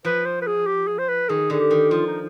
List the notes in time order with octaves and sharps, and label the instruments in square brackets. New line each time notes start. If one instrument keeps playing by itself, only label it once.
[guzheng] F3 [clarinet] B4
[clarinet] C5
B4
G#4
G4
G#4
C5
B4
[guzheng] D#3 [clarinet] G#4
[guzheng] D3 [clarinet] G#4
[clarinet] G4
[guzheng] D#3
[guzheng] F3 [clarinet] F4
[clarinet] D#4